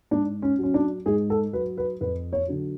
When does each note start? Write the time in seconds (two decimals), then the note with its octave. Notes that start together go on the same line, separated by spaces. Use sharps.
0.11 G#2 D4
0.42 C#4
0.59 F#3 C#4
0.74 D4
1.06 G#2 G#4
1.30 A4
1.53 F#3 B4
1.78 B4
2.01 F2 B4
2.33 C#5
2.48 D3 F#3